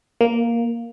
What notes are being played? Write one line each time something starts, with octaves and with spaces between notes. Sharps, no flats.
A#3